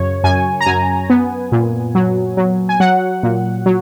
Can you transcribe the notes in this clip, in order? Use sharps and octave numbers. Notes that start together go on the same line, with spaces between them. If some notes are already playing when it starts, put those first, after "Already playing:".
Already playing: F#2 C#3 C#5
F#2 G#5
A#5
F#2 G#5
B3
A#2
F#3
F#3
G#5
F#3 F#5
A#2
F#3